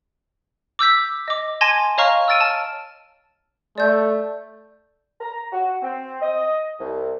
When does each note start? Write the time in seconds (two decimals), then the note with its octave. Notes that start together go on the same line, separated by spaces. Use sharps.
0.79 D6 E6 G6 B6
1.28 D#5 D6
1.61 G#5 A5 C6 G#6 A#6 D#7
1.98 C#5 D#5 F5 A#5 C#6 F6
2.28 E6 F6 A6 D7 D#7
2.41 A5 F6
3.78 A3 D5 G6
5.21 A#5
5.52 F#4
5.82 C4
6.22 D#5
6.80 C2